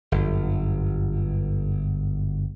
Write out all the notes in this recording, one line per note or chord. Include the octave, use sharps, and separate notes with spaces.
G1 F#2